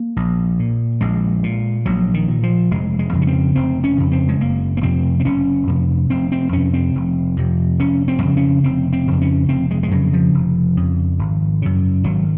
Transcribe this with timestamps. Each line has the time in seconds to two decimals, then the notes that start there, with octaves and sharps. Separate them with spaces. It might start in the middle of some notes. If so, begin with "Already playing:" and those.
Already playing: A#3
0.16 A#1
0.59 A#2
1.01 A#1 G#3
1.43 A#2
1.86 A#1 F#3
2.14 D#3
2.28 A#2
2.43 F3
2.71 F1 G#3
2.99 G#3
3.13 F2 C#3
3.22 C#4
3.27 C4
3.55 F1 C4
3.84 C#4
3.98 F2 C#3
4.12 C4
4.28 G#3
4.40 F#1 A#3
4.77 A#3
4.83 F2 C3 C4
5.20 C4
5.25 F#1 C#4
5.67 F2 C3
6.10 F1 C4
6.32 C4
6.52 F2 C3 C#4
6.74 C4
6.95 F1
7.37 F2 C3
7.79 F1 C#4
8.08 C4
8.22 F2 C#3
8.37 C#4
8.64 F1 C4
8.93 C4
9.07 F2 C#3
9.21 C#4
9.49 F1 C4
9.71 G#3
9.83 G#3
9.91 F2 C#3 F#3
10.13 F3
10.34 F1
10.77 F2 C#3
11.19 G#1
11.62 F#2 C#3
12.04 G#1 F#3